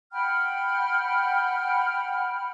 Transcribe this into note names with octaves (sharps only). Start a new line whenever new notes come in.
F#5 G5 B5 F6